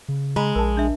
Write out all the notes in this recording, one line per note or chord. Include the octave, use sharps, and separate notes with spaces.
C#3
G#3 F#4 A#5 B5
A#1 A#4 A5
D4 E5